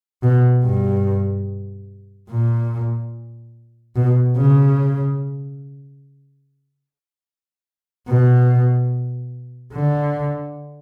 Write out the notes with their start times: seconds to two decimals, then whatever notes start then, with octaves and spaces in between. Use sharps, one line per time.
0.23 B2
0.64 G2
2.30 A#2
3.96 B2
4.37 C#3
8.09 B2
9.74 D3